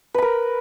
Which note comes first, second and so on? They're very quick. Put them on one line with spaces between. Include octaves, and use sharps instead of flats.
B4 B5 A#4